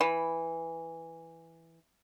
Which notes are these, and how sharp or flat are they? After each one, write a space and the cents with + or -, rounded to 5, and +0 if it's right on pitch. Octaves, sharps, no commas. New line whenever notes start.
E3 +0 B5 +0